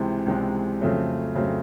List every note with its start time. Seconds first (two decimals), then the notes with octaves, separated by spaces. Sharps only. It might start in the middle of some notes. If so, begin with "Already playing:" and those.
Already playing: C#2 C3 E3 G#3 C4
0.26 C#2 C3 E3 G#3 C4
0.81 F2 C#3 F#3 A3 C4
1.35 F2 C#3 F#3 A3 C4